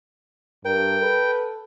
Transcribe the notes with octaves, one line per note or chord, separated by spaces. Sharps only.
G2 A#4 G5
A4 B4